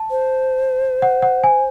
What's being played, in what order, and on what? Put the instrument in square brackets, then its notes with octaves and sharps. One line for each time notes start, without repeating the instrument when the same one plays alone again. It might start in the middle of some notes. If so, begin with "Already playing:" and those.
Already playing: [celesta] A5
[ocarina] C5
[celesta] F#5
F#5
G#5